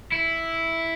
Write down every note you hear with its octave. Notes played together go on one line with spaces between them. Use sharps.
E4